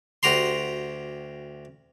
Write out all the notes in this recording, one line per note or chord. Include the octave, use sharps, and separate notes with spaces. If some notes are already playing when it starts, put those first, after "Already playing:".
D2 F#4 G4 A#5 C6